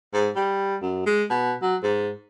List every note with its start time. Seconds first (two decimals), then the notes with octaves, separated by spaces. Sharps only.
0.13 G#2
0.36 G3
0.82 F#2
1.06 G#3
1.30 B2
1.62 F#3
1.83 G#2